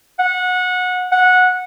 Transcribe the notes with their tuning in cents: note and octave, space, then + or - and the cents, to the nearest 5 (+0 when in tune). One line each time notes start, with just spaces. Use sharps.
F#5 -20
F#5 -15